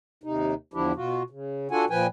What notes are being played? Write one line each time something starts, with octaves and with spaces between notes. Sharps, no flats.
D#2 C3 D#4
E2 D3 F3 D4 E4 G4
B2 F4 F#4
C#3
D4 F4 F#4 A4 F#5 G#5
A#2 F3 B4 G5 G#5